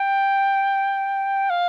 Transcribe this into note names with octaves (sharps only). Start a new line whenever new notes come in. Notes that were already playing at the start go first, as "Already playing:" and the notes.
Already playing: G5
F5